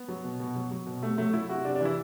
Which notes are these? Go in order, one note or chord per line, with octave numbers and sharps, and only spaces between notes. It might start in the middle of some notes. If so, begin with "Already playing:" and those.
Already playing: B3
F#3
B2
B2
F#3
F#3
B2
C3 A3
F#3 A3
F#3 E4
C3 F#4
C3 D4
D4
E3 E4